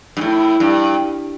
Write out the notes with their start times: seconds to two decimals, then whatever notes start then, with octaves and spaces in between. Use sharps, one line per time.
0.17 G2
0.21 A2 E4
0.60 G2